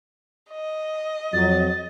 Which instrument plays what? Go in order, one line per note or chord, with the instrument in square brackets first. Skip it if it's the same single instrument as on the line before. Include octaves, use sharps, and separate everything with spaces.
[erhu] D#5
[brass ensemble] F2 F#3 [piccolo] A6